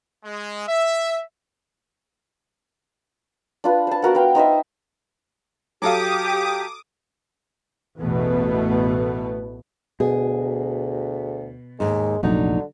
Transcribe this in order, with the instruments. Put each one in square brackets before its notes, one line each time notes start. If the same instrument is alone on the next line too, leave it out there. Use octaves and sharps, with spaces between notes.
[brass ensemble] G#3
E5
[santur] D4 F4 B4
C5 A5
B3 F#4 A#4 F#5
B4 F5 G5
D#4 C5 D#5 E5
[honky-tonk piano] F#3 A4 F5 [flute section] G4 [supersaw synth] D6 D#6
[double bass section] A1 E2 B2 A3 B3
[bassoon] D2 [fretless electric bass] B2 [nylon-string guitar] G#4
[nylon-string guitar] D#2 G#2 [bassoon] G#3
[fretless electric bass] F1 A#1 D4 [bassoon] D3 [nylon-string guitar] F#3 D#4